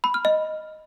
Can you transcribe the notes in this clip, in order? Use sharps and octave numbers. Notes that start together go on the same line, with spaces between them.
B5
F6
D#5